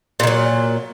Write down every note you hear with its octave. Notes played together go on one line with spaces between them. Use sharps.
A#2 D#3 F#3